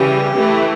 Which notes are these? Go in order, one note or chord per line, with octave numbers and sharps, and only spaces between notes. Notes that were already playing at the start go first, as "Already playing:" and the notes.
Already playing: C#3 E3 G3 G4
E3 A3 E4